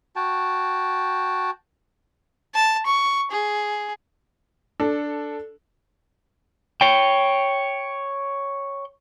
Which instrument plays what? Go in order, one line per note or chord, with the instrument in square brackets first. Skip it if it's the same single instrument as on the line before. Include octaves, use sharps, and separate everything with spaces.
[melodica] F#4 G5 A5
[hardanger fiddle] A5
C#6
G#4
[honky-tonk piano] D4 A4
[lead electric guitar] C#5 G5